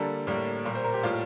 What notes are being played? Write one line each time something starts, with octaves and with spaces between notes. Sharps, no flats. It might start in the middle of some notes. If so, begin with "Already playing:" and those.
Already playing: D3 G3 A#3 A4
A2 G3 A#3
A#2 G3 A#3
C5
A#4
G4
A2 G3 A#3 F4